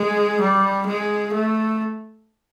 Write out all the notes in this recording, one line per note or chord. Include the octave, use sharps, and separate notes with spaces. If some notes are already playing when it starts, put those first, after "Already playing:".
Already playing: G#3
G3
G#3
A3